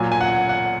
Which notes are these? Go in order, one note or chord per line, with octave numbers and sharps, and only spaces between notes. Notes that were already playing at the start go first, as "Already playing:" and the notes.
Already playing: A#2 F#3 G#5
G#5
F#5
F#5